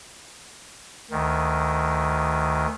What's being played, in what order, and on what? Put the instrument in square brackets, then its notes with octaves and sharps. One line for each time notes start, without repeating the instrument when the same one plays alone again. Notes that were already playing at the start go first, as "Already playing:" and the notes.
[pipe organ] D2 D#3